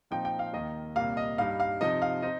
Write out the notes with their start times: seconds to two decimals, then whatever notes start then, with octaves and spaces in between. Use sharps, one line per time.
0.11 A#2 F3 C4 D#4 G5
0.25 G5
0.39 F5
0.53 D#2 D#3 A#3 D#5
0.96 C2 A#2 G3 A#3 F5
1.17 D#5
1.38 G2 G3 D#4 F5
1.60 F5
1.81 C3 F3 D#4 D#5
2.02 F5
2.22 C4 D#4 D#5